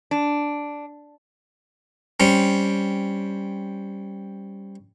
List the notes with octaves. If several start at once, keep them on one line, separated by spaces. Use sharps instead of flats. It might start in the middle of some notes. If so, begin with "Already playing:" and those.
D4
G3 C4 C#4